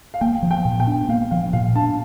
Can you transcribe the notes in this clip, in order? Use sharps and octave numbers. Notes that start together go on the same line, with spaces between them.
F5
A#3 G5
F3
G5
A#2
G5
D4
A#3 F5
F3 F5
A#2 F5
D4 A5